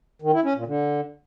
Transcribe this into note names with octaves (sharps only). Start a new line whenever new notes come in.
D#3
E4
C#4
A#2
D3